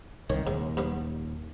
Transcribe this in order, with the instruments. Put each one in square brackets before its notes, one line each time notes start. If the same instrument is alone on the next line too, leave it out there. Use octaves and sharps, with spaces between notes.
[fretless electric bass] C2 D#3 [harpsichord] C#5
[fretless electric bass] D#1 D#2 [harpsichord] G#2
[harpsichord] G2 B3